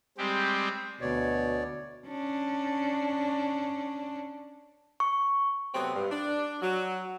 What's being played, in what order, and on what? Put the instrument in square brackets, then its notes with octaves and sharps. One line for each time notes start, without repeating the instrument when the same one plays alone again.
[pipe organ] G3 G#3 C4 G4
[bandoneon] D2 C#5 D5 [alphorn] B2
[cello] C#4 D4
[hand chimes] C#6
[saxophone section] C3 F#3 A3 B3 C4
G2
D4
F#3